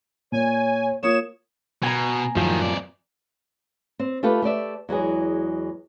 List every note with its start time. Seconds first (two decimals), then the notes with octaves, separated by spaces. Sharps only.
0.32 A#2 C#5 G#5
1.03 A#3 F4 C#5 D#6 E7
1.83 B2 G#5 A#5
2.37 F#2 A2 D#3 F3 G3
2.60 F2 D5
3.99 C4
4.23 A3 F4 G4 A4 B4
4.42 A3 G4 D5 E5
4.89 E2 F#3 G#3 G#4